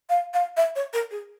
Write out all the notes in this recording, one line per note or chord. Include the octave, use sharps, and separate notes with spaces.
F5
F5
E5
C#5
A#4
G#4